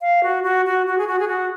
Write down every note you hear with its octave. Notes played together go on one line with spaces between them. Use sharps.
F5
F#4
F#4
F#4
F#4
G#4
F#4
G#4
F#4